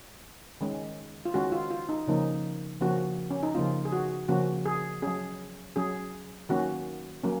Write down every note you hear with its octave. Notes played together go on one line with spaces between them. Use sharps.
D#3 G#3 C#4
F4
D#3 G#3 C#4 F#4
F4
F4
D#4
C#3 F3 A#3 C#4 D#4
C#3 F3 A#3 C#4 F#4
C#4
D#4
C#3 F3 A#3 C#4 F4
G#4
F#4
C#3 F3 A#3 C#4 F#4
G#4
F#3 C#4 G#4
F#3 C#4 G#4
D#3 F#3 A#3 C#4 F#4
F#3 A#3 C#4